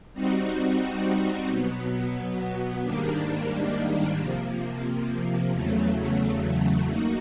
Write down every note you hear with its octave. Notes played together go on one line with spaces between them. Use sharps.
G3 C4 D#4 F#4
B2 F#3 B3
G#2 D#3 G3 A#3 D4
C3 F3 A#3
E2 C#3 F#3 A3
A#3 D#4 F#4